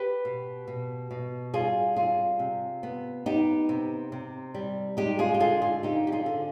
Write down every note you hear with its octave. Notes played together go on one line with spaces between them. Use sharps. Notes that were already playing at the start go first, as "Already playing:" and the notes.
Already playing: G4 B4
B2
B2
B2
G3 F4 G#4
C3 F4 G#4
C3
B3
B3 D#4 G4
C3
C3
G3
G#3 D#4 G4
F4 G#4
G4
D3 F4 G#4
F4 G#4
C4 D#4 G4
G4
F4 G#4
D3